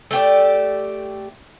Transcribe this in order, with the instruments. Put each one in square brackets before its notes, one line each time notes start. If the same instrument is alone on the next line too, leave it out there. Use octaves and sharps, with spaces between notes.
[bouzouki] A3 G4 D5